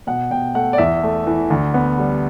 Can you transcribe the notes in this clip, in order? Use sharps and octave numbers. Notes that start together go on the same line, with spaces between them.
B2 F#5
B2 G5
A3 F#5
D5
E2 E5
A3
E3
D2
B3
G3